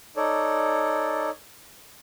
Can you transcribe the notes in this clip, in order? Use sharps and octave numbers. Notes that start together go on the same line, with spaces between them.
D#4 A4 C#5 D5